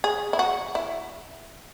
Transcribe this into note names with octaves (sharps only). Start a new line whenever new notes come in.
G#4
E4
F#4
E4